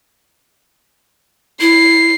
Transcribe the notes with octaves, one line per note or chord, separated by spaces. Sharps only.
E4 C7